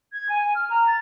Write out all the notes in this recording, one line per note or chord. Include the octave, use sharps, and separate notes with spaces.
G#6
G#5
G#5
F6
A#5
A6